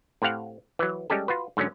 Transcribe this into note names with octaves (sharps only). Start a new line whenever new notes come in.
A2 C4 G4 F5 F#5
E3 F#3
G3 G#3 C#4 G4 A4
F4 F#4 B4
G#2 D3 F#3 C#4